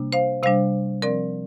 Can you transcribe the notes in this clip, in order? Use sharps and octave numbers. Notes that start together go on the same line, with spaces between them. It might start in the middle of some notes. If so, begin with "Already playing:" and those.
Already playing: C3 G3 A#3 D4
C5 F5
C3 G3 D4 C5 F5
F3 C4 A#4 D5